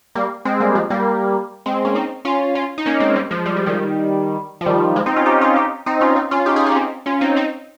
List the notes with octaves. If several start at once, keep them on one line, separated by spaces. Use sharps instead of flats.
G3 A#3
G#3 C4
G3 A#3
F3 G#3
G3 A#3
G#3 C4
A#3 C#4
C4 D#4
C#4 F4
C#4 F4
D#4
A#3 C#4
G#3 C4
G3 A#3
F3 G#3
G3
F3
D#3 G3
F3
D#3 G3
F3 G#3
C4 D#4
C#4 F4
D#4 G4
C#4 F4
D#4 G4
C4 D#4
C#4 F4
C4 D#4
C#4 F4
D#4 G4
F4 G#4
D#4 G4
C#4
C4 D#4
C#4 F4
C4 D#4
C4 D#4